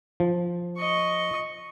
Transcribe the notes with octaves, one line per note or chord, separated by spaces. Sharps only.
F3
D#5 C#6